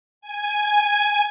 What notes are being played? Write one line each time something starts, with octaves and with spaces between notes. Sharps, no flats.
G#5